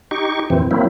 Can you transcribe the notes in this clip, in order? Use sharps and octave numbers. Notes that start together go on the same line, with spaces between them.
D#4 G4 C#6
F2 A#2 E3 C4
F#3 A#3 C4 E4